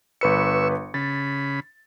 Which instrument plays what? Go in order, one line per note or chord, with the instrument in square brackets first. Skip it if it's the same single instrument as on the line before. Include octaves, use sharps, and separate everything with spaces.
[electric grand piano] G1 B4 C#7 [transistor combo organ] C#6 E6
[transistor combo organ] C#3 B5 [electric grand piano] A6